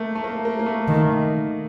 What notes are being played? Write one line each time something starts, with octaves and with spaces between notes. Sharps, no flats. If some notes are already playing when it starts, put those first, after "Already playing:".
Already playing: A3 A#3
A3
A#3
A#3
A#3
A3
D#3